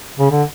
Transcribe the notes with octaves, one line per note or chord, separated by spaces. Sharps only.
C#3
D3